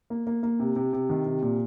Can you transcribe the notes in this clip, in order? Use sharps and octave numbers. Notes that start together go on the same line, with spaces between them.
A#3
A#3
A#3
C3
C3
C3
D#3
C3
A#2